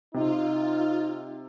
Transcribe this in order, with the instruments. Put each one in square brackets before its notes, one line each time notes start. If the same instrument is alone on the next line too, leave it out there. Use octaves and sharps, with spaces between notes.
[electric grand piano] C3 [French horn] D#4 [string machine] F4